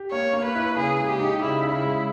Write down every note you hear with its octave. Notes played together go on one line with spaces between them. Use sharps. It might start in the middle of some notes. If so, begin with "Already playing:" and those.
Already playing: G4
A#3 C#5
A#3
B4
E4
C#3 G#4
G#3
G4
D#4
C#3 E4
C#3
E4
G#3